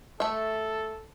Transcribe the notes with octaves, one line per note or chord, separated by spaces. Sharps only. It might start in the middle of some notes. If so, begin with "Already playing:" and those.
A3 A4 E5